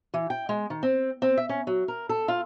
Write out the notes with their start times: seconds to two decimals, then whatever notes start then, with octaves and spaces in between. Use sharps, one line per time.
0.14 E3
0.30 G5
0.49 G#3
0.70 D#3
0.83 C4
1.22 C4
1.37 E5
1.49 C#4
1.67 F#3
1.88 A#4
2.09 A4
2.28 F4